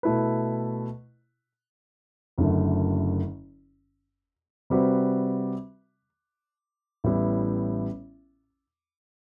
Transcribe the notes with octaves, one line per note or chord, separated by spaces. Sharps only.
B2 A3 E4 B4
F#1 F#2 D3 A3
C3 G3 C4 F#4 B4
A1 A2 G3 B3 E4